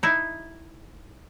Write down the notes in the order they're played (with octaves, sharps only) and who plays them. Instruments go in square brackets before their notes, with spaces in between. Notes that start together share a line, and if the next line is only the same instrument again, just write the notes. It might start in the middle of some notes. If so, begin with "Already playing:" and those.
[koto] D#4 E4